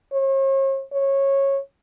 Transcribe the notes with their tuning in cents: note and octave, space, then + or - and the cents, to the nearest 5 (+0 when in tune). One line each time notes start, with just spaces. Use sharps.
C#5 -45
C#5 -15